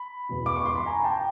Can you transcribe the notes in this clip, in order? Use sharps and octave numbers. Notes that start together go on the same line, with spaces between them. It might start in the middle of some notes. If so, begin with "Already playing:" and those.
Already playing: B5
E2 B2
D6
C#6
C6
B5
G#5 A#5
G5 A5